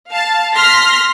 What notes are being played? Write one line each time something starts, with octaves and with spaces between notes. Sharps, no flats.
F5 A5
C6 F6 A#6 B6